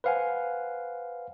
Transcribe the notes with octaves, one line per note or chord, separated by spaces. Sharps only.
B4 C5 F5 F#5 G#5